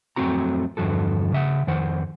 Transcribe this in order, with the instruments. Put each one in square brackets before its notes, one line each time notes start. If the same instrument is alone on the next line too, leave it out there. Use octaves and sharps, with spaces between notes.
[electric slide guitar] F2 F#3 A3 C4 F#4 A#5
E2 G2 D3 F3 F#4 A4
C#3 E5 F#5
F2 D#3 C5 F#5